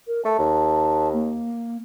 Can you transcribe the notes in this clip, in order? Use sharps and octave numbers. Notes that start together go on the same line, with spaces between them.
A#4
A3 A5
D#2
A#3